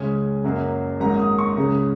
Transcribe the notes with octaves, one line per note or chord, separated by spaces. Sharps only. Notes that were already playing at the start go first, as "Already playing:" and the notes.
Already playing: C#2 C#3 G#3 C#4 G#5
F#1 F#2 F#3 A#3 C#4
G#1 G#2 F#3 A#3 C#4 A#5
D#6
C#6
C#2 C#3 G#3 C#4 A#5